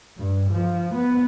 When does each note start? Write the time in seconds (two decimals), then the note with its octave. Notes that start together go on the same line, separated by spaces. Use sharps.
0.17 G2
0.50 F3
0.94 B3